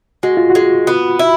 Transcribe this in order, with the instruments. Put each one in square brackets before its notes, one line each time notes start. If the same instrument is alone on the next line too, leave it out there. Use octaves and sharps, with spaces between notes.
[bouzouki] G#3 [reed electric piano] F#4
[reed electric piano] F4
F#4
[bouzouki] G#3
B3
E4